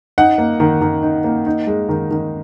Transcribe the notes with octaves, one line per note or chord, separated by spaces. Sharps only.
D#4 F#5
A#3
D#3
D#3
D#4
A#3
D#4
G#3
D#3
D#3